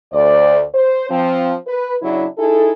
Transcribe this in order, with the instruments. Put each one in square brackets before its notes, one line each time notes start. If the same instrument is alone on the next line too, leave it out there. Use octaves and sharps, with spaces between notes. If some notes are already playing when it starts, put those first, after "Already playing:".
[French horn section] D2 C5 D5
C5
F3 C4
B4
C#3 F#3 D4 E4
D#4 E4 G#4 A4